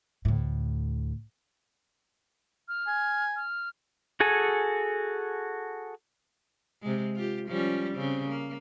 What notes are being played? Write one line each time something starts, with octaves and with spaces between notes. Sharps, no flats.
D2 A2
F6
G#5
F6
F#4 G#4 A4 G#5
C3 G#3
F4 G4
F3 G3 C#4
C#3 C4
A#3